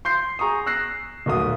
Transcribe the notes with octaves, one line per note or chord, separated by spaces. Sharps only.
C6 G6 C7
G#4 A#5 C#6 D#6
E6 F#6 A#6 C7
D#1 B1 A3 D#6